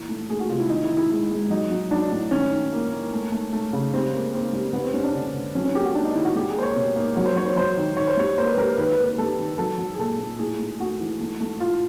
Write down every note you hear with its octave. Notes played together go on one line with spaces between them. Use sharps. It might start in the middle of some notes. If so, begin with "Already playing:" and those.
Already playing: A#2 E3
A3
A3 G#4
F#4
C3 F4
E4
D#3 D#4
E4
D#3
E4
G#3
G#3
F#3 D#4
F#3
F#3 D4
A2
D#3 C#4
D#3
A#3
A#3
A3
A3
A3
C#3
G3 C4
A#3
A#3 C4
G3
G3 B3
C4
G3 C#4
D4
D3
D3
F#3 C#4
C#4
A#3 G4
F#4
A#3 D4
D#4
D#3 E4
F#4
G3 G4
G#4
A#3 C5
C#5
B2
A#3
F#3 C#5
C5
F#3 C#5
C5
F#3 C5
D#3
D#3 C#5
C5
G3 C#5
A#3 C5
B4
G3 A#4
A#4
D#3 B4
B4
A#3
B4
G3 A4
D#3
F#3 A4
F#3
G#4
A#2 A4
A#2
A2 G#4
A3
A3 F#4
E3
A3
A3
A2 F4